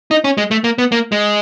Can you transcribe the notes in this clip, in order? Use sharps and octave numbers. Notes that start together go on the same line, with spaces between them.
D#4
C#4
G#3
A3
A#3
B3
A#3
G#3